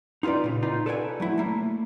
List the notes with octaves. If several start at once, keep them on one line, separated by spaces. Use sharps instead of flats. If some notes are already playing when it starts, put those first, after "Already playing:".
D#4 F4 G#4 B4 D5
A#2 C#3
D#4 F4 B4 D5
A4 B4 C#5 D5 E5 G#5
F#3 A3 E4
A3 A#3